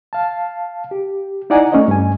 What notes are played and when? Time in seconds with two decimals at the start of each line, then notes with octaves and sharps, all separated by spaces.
0.13 F5 A5
0.91 G4
1.50 D#4 E4 D5 F#5 G#5 A#5
1.72 A3 C#4 C#5 D#5
1.88 G2 G#5